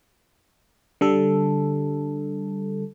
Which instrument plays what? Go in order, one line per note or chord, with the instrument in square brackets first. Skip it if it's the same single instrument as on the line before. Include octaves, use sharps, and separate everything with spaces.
[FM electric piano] D3 G3 A4